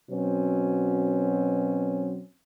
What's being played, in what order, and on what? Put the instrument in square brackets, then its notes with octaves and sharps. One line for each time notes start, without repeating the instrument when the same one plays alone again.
[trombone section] B2 F#3 C4 C#4